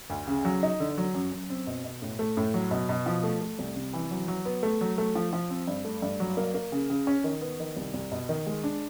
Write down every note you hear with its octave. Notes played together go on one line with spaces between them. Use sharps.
D2
C#3
F#3
D#4
D3
F#3
F#2
F#2
C4
B2
B2
A2
A3
A2
F#3
B2
B2
F3
A3
A3
C2
C3
E3
F#3
F#3
B3
A3
F#3
A3
F3
F3
C4
G2
A3
G2
F#3
A#3
A#3
C#3
C#3
C#4
D#3
B3
D#3
C2
C2
B2
D#3
G#3
D4